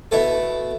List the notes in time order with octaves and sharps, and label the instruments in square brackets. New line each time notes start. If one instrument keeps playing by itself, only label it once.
[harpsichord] B2 A3 E4 A4